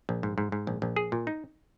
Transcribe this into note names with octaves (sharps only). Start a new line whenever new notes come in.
A#1
G#2
G#2
G#2
A#1
A#1
G#4
A#2
D#4